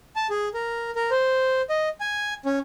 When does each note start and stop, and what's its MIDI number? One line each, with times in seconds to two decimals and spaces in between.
0.16 0.27 81
0.30 0.48 68
0.54 0.90 70
0.96 1.10 70
1.11 1.62 72
1.70 1.89 75
2.00 2.34 80
2.46 2.59 61